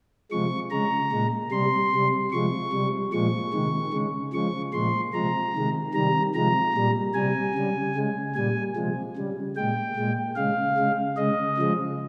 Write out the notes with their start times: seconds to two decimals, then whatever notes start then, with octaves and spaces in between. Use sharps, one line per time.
0.31 C3 F3 G#3 C#6
0.71 C#3 G#3 A#5
1.12 A#2 G#3
1.51 C3 G3 C6
1.92 C3 G3
2.31 C3 F3 G#3 C#6
2.72 C3 G3
3.12 A#2 F3 G#3 C#6
3.53 C3 D#3 G#3
3.93 C#3 G#3
4.33 C#3 F3 G#3 C#6
4.73 A#2 F3 G#3 C6
5.13 C3 F3 G#3 A#5
5.53 C3 D#3 G#3
5.94 C3 D#3 G3 A#5
6.35 C3 F3 G#3 A#5
6.74 A#2 G3
7.14 C3 G3 G#5
7.55 C#3 G3
7.95 C#3 G#3
8.35 A#2 G3 G#5
8.76 C3 F3 G#3
9.16 C#3 G3
9.56 A#2 G#3 G5
9.96 A#2 G#3
10.36 C#3 G#3 F5
10.77 C#3 G#3
11.17 C#3 G#3 D#5
11.57 C#3 F3 G#3